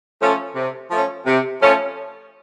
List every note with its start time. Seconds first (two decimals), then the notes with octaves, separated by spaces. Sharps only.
0.21 F3 A3 C#4
0.55 C3
0.91 F3 A3 C#4
1.26 C3
1.60 F3 A3 C#4